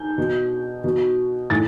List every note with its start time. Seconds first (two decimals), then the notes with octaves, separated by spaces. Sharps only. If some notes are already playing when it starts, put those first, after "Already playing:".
Already playing: G6
0.18 B2
0.84 B2
1.50 A2 A6